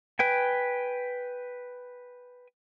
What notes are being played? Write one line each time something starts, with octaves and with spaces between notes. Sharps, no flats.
B4 G5 G#5